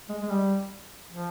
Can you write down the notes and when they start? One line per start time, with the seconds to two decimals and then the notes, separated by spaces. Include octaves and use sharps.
0.09 G#3
0.22 G#3
0.30 G3
1.13 F3